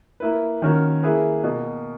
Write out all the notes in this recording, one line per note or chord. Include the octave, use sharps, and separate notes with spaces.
A#3 E4 B4
D#3 A#3 C#4 F#4 A#4
A#3 E4 G#4 B4
B2 A#3